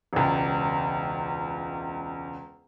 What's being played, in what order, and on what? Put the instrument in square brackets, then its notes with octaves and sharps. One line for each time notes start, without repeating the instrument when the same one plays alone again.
[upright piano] E1 C#2